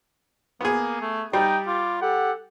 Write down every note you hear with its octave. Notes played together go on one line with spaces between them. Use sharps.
A#3 B3 G#4
A3
G3 D#4 G4 G5
F4 D6
G4 A4 F#5